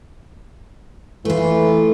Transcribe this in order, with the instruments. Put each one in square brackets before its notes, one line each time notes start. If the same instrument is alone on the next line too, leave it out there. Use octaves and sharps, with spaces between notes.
[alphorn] E3 [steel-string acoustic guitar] A3 F4